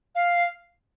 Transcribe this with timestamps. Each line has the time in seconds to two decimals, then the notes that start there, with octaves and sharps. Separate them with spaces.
0.15 F5